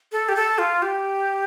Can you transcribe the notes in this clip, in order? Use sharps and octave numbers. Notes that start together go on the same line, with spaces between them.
A4
G4
A4
F4
G4